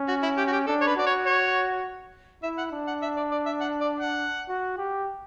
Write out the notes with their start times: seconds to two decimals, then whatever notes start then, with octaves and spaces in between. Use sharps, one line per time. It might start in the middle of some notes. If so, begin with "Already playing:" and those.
Already playing: C#4
0.08 F#4
0.23 E4
0.37 G4
0.47 F#4
0.52 G4
0.67 D4 A4
0.81 C#5
0.87 B4
0.97 F#4 D5
1.06 C#5
1.26 C#5
2.43 E4 E5
2.58 F#5
2.72 D4
2.87 F#5
3.02 E5
3.17 D5
3.31 D5
3.46 E5
3.61 F#5
3.81 D5
4.00 F#5
4.49 F#4
4.78 G4